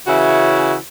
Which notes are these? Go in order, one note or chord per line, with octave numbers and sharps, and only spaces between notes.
C#3 E3 C#4 E4 F#4